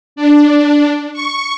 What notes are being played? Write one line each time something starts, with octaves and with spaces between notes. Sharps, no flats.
D4
C#6